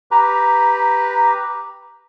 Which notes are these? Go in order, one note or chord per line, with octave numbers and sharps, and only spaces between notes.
G4 B4 A#5